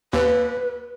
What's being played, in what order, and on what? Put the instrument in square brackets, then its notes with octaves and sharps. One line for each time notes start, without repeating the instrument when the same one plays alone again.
[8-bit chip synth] D#2 [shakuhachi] B4